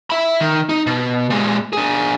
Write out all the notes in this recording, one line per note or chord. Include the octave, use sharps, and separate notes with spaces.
E5 B5
D#3
D#4
B2
A#2 G#3
D4 G#4